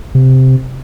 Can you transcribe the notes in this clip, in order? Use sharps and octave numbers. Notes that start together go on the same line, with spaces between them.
C3